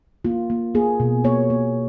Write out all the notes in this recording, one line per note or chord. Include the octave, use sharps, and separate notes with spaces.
A#3 F4
A#3
A#3 G#4
B2
A#3 C#5
A#3